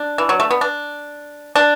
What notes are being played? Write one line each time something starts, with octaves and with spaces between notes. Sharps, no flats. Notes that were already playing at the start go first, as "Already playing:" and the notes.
Already playing: D4
E3
F#3
A3
B3
D4
D4